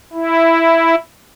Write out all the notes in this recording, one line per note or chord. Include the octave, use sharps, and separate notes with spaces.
E4